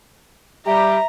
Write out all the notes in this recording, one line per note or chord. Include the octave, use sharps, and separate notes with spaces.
G3 G4 E5 A#5